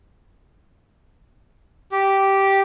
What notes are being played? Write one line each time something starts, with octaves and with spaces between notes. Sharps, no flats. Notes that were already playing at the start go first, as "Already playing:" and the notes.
G4